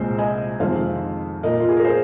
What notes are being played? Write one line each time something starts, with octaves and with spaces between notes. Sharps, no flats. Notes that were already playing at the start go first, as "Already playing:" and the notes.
Already playing: C2 A#2 G#3 C4 C5
D#5 G#5
F2 D#3 G#3 C4 C5 F5
A#2 A#3 A#4 D#5
F4
G#4
A#4
G#4 C5